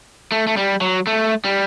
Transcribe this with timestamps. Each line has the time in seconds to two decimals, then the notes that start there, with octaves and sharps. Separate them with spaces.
0.32 A3
0.47 A3
0.57 G3
0.81 F#3
1.07 A3
1.45 G3